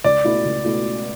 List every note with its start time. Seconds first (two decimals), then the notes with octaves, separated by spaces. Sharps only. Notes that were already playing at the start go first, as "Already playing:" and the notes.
0.04 C#2 D5
0.25 B2 A3 E4
0.45 C#2
0.65 B2 A3 E4